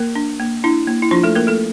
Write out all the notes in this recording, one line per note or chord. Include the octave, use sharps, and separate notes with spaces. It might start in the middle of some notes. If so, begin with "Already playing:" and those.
Already playing: A#3 A#4
D4
A#3
D4 E4
A#3
E4
F3 D4 F4
A3 A4
A#3 A#4
A3 A4